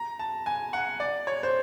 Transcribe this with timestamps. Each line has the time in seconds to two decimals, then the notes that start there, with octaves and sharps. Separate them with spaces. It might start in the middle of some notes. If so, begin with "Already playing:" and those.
Already playing: A#5
0.19 A5
0.46 G#5
0.73 F#5
1.00 D5
1.27 C#5
1.43 C5